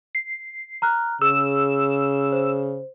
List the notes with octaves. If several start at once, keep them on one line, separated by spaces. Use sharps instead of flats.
C7
A#5 F6 F#6
C#3 G#4 E6
C5